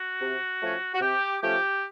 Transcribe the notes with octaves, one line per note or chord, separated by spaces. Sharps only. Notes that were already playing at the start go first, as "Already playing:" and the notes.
Already playing: F#4
C3
F3 A3 C#4
F#4
C3 G4
F3 A3 C#4 G4